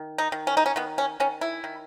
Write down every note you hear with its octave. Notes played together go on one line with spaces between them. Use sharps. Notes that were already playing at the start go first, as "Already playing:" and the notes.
Already playing: D#3
D#4
D#3
C#4
D#4
C#4
D#3 B3
C#4
D#3 C#4
E4
D#3